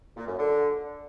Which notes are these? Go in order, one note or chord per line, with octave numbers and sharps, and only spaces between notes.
A#2
F#2
D3